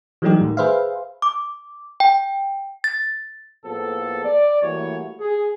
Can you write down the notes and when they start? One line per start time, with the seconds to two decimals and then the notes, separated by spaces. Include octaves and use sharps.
0.22 E3 F#3 G3 A3 D#4 G4
0.41 A2 D#3
0.57 G#4 B4 C5 E5 F5
1.22 D6
2.00 G5
2.84 A6
3.66 A2 F3 A#3 B3 G#4 A4
4.24 D5
4.62 E3 G3 A3 A#3 F#4 C#5
5.19 G#4